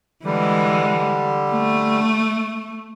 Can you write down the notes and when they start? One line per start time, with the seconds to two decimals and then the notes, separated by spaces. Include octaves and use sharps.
0.25 D3 E3 G3 G#3
1.52 A3